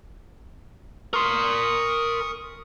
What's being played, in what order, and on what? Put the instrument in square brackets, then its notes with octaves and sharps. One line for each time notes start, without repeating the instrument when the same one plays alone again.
[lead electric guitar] A#4 C6 [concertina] C#6 D#6